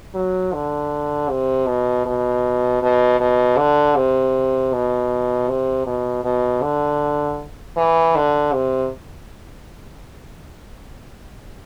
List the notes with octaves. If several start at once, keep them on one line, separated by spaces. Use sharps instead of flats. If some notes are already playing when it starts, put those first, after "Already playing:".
F#3
D3
C3
B2
B2
B2
B2
D3
C3
B2
C3
B2
B2
D3
E3
D3
C3